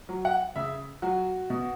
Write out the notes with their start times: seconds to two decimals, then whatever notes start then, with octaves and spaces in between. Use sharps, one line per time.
0.09 F#3
0.25 F#5
0.56 C#3 E5
1.02 F#3 F#4
1.50 B2